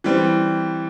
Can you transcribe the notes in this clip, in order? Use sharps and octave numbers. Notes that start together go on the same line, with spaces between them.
E3 G3 C4